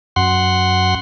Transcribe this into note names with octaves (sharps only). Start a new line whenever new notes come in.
F#2 F#5 C6